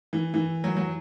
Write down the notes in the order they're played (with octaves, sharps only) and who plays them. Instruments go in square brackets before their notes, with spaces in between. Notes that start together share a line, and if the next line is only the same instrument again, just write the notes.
[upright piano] E3
E3
F#3
F#3